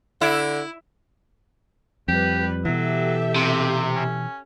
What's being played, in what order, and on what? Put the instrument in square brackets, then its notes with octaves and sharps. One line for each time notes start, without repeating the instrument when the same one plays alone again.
[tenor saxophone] D3 [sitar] E4
[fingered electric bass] F2 [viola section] G3 B4 [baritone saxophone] G4
[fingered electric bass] B2 E3 [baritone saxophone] F#3 [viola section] G4 A4 E5
[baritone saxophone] D#2 [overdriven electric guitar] C3
[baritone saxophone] C#4